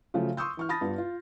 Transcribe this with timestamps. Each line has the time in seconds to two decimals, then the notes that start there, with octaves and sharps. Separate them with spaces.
0.14 C#3 F3 F#3 A3
0.37 C6 C#6 D#6 E6 G6
0.57 E3 C#6 F6
0.69 A5 B5 D#6 A6 A#6
0.81 G2 B3 F4
0.98 F4